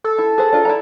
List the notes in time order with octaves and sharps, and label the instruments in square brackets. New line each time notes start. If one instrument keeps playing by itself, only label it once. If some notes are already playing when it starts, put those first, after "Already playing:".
[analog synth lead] A4
[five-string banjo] E4
G#4 B4 C5
D4 F4 A#4
E4 D5 A#5